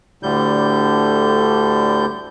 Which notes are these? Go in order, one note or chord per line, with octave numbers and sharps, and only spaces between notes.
D2 A2 D3 G3 G6